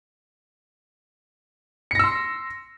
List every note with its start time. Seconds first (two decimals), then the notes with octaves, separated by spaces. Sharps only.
1.91 C#7
1.95 A#6
1.99 E6
2.04 C6